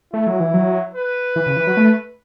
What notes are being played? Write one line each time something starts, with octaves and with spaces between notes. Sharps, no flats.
A3 E4
F#3
E3
F#3
B4
E3
C#3
E3
F#3
A3